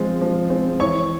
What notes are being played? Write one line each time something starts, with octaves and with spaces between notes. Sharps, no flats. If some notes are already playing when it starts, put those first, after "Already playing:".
Already playing: F3 G#3 C4
F3
G#3 C4
E3 C#5 C#6